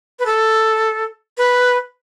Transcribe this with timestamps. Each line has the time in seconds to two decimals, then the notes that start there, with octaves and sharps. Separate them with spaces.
0.19 B4
0.26 A4
1.38 B4